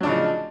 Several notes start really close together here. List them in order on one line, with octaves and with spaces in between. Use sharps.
F#3 D4 C#3 D#4 F3